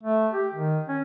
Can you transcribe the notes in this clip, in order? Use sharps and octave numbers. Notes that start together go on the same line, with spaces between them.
A3
G4
D#3
C#4